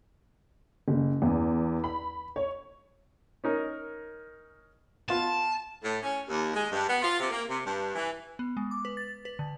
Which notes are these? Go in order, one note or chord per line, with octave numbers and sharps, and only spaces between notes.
F#1
E2
B5
C#5
C#4 D#4 A#4
B3 F4 A5
A2
C#4
D#2
G#3
G2
B3
F4
C3
A#3
C3
G2
E3
B3
G#3
D6
B4
A6
B4
D3